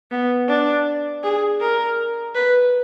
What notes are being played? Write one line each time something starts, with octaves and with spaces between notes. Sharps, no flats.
B3
D4
G#4
A#4
B4